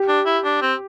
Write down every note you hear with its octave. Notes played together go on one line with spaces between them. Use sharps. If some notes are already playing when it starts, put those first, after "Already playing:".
Already playing: G4
D4
E4
D4
C4